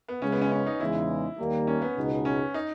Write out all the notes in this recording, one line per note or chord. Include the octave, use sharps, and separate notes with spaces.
B3
C#2 C#3 G#3 C#4
B3
C#4
C#4
D#4
E2 C#3 E3 G#3 D#4 E4
D#2 D#3 G3 A#3
C#4
B3
C#2 B2 G#3 D#4
C#4
D#4